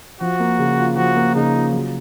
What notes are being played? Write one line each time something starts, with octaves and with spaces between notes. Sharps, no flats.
F3 F#4
A#3
C#3
F4
F3 F#4
A#3
C#3 D#4
F4
F#3